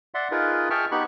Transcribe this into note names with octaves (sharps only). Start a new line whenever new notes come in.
D5 E5 F#5 C6
D#4 F4 G#4 A#4 B4
G#4 E5 G5 A5 C#6 F6
B3 D#4 G4 B5 C#6 F#6